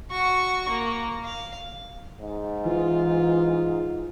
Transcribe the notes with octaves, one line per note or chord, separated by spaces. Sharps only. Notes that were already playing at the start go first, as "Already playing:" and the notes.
F#4 C#6
A#3
F5
G#2
E3 F4